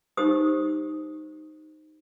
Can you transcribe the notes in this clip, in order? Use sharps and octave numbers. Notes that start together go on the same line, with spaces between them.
D#4 G4 C5 D#6